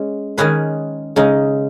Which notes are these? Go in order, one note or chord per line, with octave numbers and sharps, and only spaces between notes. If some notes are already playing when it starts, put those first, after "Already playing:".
Already playing: G#3 C#4
D#3 G#3 C#4 G#4 B4
C#3 G#3 D#4